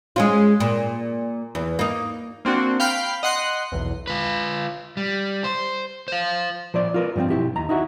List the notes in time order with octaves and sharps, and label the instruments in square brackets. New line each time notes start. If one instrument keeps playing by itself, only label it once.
[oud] G#3 C#4 F4
A#2
E2
A#3 D#4
[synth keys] A#3 C4 D4 F#4
F5 G5 B5 F6 G6
D#5 F#5 C6 F#6
B1 E2
[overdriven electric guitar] F4 B4
G3
C5
C5 F5
[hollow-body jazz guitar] F3 C5 D5
F4 A#4 B4
G2 F3 A#3 C4
B1 E4 G4
D#2 A#5
D#4 E4 F#4